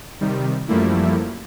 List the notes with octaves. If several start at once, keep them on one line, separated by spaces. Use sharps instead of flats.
C3 D#3 G3
F#2 F3 G3 A3 A#3 E4